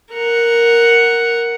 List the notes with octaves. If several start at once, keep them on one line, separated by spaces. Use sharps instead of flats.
A#4 F#5